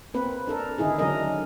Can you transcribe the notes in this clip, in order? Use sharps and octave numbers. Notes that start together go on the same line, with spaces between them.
A#3 C4 B4
D4 A4 A#4
D3 D#3 D#4 E4 G#4
D3 F#3 C#4 D4 A#4 D#5